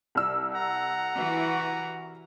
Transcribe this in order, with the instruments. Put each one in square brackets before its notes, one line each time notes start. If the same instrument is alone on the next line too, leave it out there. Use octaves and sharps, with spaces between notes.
[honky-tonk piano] C2 E6
[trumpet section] F#5 A#5
[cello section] E3 F#4